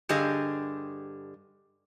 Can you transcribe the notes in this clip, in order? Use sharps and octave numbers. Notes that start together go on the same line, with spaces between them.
G2 D3 G4 G#4 D#5